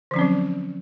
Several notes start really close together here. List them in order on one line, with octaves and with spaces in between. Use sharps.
D3 F3 C#4 C4 F#3